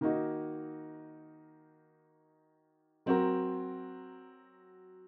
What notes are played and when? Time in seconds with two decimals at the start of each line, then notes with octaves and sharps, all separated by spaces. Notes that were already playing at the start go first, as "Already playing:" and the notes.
0.01 D#3 A#3 D#4 F#4
3.06 F#3 C4 F#4 A#4